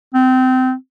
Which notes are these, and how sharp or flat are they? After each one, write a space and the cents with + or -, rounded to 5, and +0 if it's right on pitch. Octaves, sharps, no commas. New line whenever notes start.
C4 -25